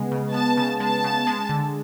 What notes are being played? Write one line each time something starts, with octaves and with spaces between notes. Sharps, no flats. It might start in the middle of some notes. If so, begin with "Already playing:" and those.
Already playing: C#3 G#3 B3
C#3
B3 A5
C#3
G#3 A5
C#3
G#3
D3